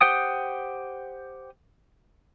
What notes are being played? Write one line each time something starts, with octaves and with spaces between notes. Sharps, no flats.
G4 C5 F#5 G5 D#6